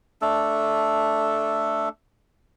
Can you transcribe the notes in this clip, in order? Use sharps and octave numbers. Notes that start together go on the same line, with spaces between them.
A3 D4 A4